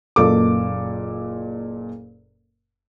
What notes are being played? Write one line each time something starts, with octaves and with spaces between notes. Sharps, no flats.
F#1 A#2 A4 D6